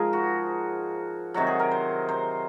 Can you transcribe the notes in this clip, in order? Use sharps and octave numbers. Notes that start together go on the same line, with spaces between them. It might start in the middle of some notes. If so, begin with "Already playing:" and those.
Already playing: G#2 F3 G#4 A#4
F#4
C3 D#3 F#3 F#4
G#4
A#4
C5
C5